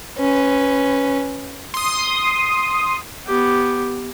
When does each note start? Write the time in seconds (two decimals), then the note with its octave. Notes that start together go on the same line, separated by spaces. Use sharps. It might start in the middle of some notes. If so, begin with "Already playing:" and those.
0.19 C#4 B4
1.74 C6 D#6
3.27 B3 G4